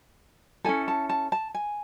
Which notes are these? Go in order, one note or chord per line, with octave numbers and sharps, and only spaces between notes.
C#4 E4 A4 G#5
A5
A5
A5
G#5